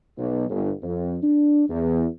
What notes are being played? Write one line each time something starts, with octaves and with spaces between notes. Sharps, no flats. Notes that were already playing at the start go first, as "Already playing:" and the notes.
B1
G1
F2
D4
E2